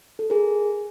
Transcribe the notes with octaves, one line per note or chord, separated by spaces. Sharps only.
A4
G#4 A#4